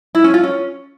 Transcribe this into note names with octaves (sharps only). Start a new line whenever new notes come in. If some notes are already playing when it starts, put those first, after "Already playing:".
E4
C#4
F4
C#4